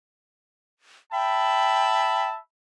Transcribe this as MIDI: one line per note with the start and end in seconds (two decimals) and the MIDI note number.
1.13 2.39 76
1.13 2.29 79
1.13 2.39 81
1.13 2.39 83